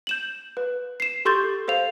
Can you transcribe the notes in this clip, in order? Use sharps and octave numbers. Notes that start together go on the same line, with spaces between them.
G6 E7 F#7
B4
C7 E7
G4 A4 C6 C#6 G6 A6
A4 C5 F5 F7